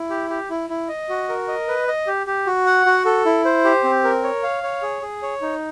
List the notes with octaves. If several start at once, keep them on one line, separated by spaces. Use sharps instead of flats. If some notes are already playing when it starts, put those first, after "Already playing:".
Already playing: E4
G4
G4
E4
E4
D#5
F#4
A#4
D#5
B4
D#5
G4
G4
F#4
F#5
F#4
A4
E4
C5
G4
C4
A#4
C#5
F5
C#5
G#4
G#4
C#5
D#4